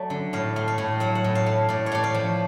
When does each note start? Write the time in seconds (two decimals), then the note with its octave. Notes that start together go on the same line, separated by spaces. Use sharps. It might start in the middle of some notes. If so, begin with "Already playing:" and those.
Already playing: F#3 A3 D5
0.10 D3
0.33 A2 F5
0.56 A3
0.68 F5
0.78 A2
1.00 F#3 F#5
1.15 F#5
1.24 A2
1.35 F5
1.46 A3
1.69 A2 D5
1.86 C#5
1.92 A3 D5
2.04 F5
2.14 F3